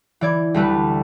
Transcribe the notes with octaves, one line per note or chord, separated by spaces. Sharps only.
E3 D5 G#6
D2 G3 A3 B4